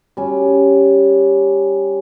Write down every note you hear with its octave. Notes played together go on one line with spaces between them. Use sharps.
G3 C#4